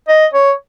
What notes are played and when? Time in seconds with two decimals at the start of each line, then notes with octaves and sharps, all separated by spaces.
0.08 D#5
0.33 C#5